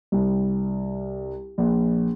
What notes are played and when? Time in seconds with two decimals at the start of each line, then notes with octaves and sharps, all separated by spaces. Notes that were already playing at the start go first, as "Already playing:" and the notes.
0.12 C2
1.58 A#1